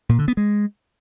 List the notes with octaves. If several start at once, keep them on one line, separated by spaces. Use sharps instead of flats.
A#2
D3
B3
G#3